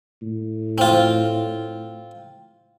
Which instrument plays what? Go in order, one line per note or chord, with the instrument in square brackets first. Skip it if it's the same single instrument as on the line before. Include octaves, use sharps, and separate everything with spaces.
[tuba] A2
[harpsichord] C4 F4